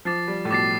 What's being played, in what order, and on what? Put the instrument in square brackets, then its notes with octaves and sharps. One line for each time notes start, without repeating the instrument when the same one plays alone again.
[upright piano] F3 [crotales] D6 A6 C7
[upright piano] G3
A2
[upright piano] B2 [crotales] D6 A6 C7